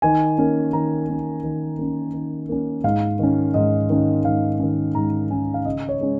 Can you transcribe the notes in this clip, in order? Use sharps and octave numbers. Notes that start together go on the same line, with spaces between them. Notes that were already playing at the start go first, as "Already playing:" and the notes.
D#3 G#5
A#3 C#4
D#3 A#5
A#3 C#4
D#3
A#3 C#4
D#3
A#3 C#4
G#2 F5
D#3 C#4
G#2 D#5
D#3 C#4
G#2 F5
D#3 C#4
G#2 A#5
D#3 C#4 G#5
F5
C#3 D#5
C#5
G#3 C#4